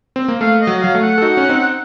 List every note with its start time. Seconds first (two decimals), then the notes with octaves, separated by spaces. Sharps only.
0.16 C4
0.28 A#3
0.41 A3 F5
0.61 D#5
0.67 F#3
0.81 F#3 F5
0.95 A3
1.02 F#5
1.18 A4
1.22 D#4 F#4
1.37 C#4
1.49 C4 D#4